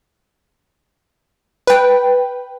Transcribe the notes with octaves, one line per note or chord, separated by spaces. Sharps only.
B4 G5